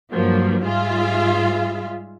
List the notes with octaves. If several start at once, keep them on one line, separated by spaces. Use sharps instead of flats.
G2 F3 F#3 A#3
G#2 G3 F4 G#4 E5 F5